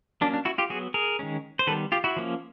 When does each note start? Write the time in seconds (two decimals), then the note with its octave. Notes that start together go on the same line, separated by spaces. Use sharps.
0.21 F#3 A#3 C#4 D4
0.34 D4
0.45 E4 F#4
0.58 F4 G4
0.70 F#3 B3 F#4 G#4
0.94 G#4 A#4
1.19 D#3 G#3 C#4
1.59 C5
1.67 D#3 G3 B3 A4 B4
1.92 F4 G4
2.04 E4 F#4
2.16 F3 A#3 C#4